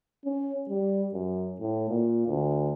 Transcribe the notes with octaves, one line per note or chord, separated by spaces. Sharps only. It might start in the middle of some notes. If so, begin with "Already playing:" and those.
C#4
G3
F#2
A2
A#2
D2